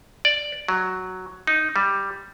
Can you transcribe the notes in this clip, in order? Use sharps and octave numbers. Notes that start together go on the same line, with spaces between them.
D5
F#3
D#4
G3